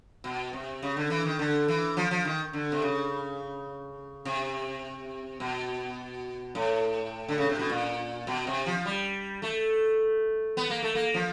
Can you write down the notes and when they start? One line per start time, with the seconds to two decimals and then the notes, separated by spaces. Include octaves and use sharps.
0.24 B2
0.53 C3
0.83 C#3
0.97 D3
1.10 E3
1.26 D#3
1.39 D3
1.68 E3
1.97 F3
2.11 F3
2.25 D#3
2.53 D3
2.72 C3
2.82 C#3
4.25 C3
5.40 B2
6.55 A2
7.28 D3
7.38 C#3
7.50 C3
7.59 B2
7.70 A#2
8.27 B2
8.47 C3
8.66 F3
8.85 G3
9.42 A3
10.57 B3
10.70 A#3
10.82 A3
10.95 A#3
11.14 F3